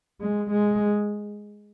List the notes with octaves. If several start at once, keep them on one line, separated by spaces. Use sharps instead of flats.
G#3
G#3